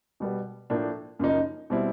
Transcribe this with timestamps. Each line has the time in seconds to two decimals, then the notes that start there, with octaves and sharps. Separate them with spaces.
0.20 B2 G3 B3
0.70 A2 F3 A#3 D4
1.19 F#2 C#3 F3 A#3 D#4
1.70 B2 G3 C4 E4